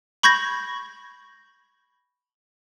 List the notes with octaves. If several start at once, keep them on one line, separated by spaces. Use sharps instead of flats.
B5 C#6 G6 G#6 A#6